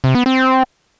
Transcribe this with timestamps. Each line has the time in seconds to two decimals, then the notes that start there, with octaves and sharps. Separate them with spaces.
0.04 C3
0.15 B3
0.26 C4